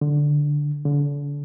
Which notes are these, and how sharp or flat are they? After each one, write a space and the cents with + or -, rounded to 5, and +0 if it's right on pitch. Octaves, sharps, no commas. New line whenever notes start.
D3 +0
D3 -35